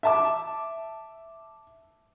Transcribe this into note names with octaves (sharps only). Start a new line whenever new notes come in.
E5 A5 D6